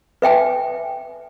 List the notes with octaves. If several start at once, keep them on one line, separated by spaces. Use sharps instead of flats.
B4 E5 G5 G#5